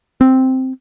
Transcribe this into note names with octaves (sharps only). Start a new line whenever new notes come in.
C4